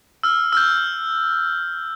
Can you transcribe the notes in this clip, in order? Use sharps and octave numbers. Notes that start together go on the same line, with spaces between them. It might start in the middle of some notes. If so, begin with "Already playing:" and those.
E6 F6
E6 F6 G6